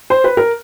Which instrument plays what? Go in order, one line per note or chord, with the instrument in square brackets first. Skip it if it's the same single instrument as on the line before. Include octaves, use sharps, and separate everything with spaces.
[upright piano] C5
B4
A#4